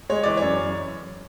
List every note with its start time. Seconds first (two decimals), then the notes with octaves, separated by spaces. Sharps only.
0.09 G#3 C#5
0.23 E3 D5
0.37 F#2 C#5